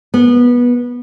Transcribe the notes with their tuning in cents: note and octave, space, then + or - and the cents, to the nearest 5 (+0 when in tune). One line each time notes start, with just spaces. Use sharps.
B3 -20